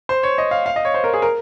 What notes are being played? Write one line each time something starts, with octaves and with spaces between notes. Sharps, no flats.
C5
C#5
D#5
F5
F5
D#5
C#5
C5
A#4
G#4
A#4